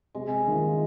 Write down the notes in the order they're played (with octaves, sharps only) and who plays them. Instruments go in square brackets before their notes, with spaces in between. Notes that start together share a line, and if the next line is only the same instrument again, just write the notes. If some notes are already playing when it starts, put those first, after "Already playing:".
[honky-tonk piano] C3 [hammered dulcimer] G#3
[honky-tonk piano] D#3 A#3 F4